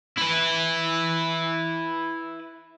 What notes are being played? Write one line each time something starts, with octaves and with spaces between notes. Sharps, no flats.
E4 B4